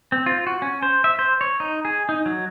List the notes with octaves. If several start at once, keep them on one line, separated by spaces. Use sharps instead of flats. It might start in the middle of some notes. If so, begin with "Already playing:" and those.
C4
F4
F#4
C#4
C5
E5
C5
C#5
D#4
G#4
D#4
F#3